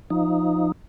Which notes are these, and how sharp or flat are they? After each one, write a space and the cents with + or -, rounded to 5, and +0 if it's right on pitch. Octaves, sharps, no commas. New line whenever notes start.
F3 +0 D#4 +0